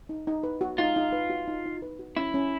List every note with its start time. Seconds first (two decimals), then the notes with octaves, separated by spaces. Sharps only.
0.09 D#4
0.27 D#4
0.43 B4
0.61 F#4
0.78 D#4 F4
0.96 D#4
1.12 B4
1.30 F#4
1.48 D#4
1.66 D#4
1.82 B4
1.99 F#4
2.17 C#4 E4
2.34 C#4